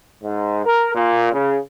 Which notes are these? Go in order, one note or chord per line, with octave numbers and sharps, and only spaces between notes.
G#2
A#4
A#2
C#3